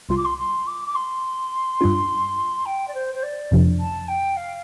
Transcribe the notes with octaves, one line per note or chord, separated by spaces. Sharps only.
C2 C3 G3 F4 C6
D6
C6
C6
D6
D6
C6
G2 G3 D4 F4
G5
D5
C5
C5
D5
G1 F2 C3 F3 D4
A5
G5
F5